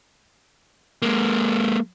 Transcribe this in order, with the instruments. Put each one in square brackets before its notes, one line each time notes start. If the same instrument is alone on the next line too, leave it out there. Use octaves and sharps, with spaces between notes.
[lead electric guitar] G#3 A#3